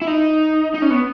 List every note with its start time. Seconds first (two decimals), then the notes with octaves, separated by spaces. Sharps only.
0.02 E4
0.07 D#4
0.74 D#4
0.82 C#4
0.90 B3